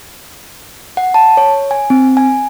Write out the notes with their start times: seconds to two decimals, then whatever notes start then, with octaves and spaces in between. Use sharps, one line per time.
0.97 F#5
1.14 A5
1.37 C#5
1.71 G#5
1.90 C4
2.17 G#5